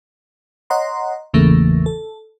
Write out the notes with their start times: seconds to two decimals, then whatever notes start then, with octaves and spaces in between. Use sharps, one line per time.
0.70 C#5 D#5 F#5 A#5 C6
1.34 G#1 E2 C#3 E3 A3 A#3
1.86 A4